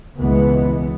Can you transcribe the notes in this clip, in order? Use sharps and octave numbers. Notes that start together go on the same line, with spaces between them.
C#2 B2 E3 G#3 B3